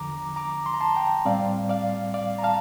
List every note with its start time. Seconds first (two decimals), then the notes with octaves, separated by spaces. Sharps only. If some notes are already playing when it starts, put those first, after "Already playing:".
Already playing: E2 D3 F3 A#5 D6
0.36 A#5 D6
0.66 C6
0.74 A#5
0.81 A5 C6
0.95 G5 A#5
1.25 A2 G3 C4 D5 F5
1.69 D5 F5
2.14 D5 F5
2.38 A#5
2.43 F5 A5